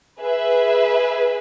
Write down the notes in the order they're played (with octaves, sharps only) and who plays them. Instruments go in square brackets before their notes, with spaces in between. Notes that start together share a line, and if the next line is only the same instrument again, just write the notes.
[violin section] G#4 B4 E5